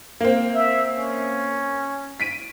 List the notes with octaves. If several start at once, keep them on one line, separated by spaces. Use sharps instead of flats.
A#3 C4
E5
C#4
B6 D7 D#7